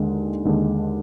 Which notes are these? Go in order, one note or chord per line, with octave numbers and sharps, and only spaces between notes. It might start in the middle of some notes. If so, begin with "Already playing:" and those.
Already playing: D#2 D3 G#3
D#2 D3 G#3 D4